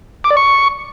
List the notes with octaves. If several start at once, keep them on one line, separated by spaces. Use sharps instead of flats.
D6
D5
C#6